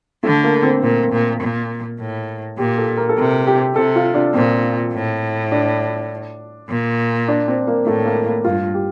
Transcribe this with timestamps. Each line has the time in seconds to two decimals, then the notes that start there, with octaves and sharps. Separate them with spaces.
0.23 D3 A3
0.44 A#3
0.63 C4
0.82 A#2 A#3
1.12 A#2
1.41 A#2
2.00 A2
2.58 A#2 G4
2.78 A4
2.97 A#4
3.09 A4
3.17 C3 A#4
3.47 G4
3.76 C3 A4
3.96 F4
4.14 D4
4.34 A#2 C4
4.93 A2
5.52 D4
6.69 A#2
7.28 D4
7.48 C4
7.67 A#3
7.86 A2 A3
8.05 A#3
8.26 A#3
8.44 G2 F4
8.74 G4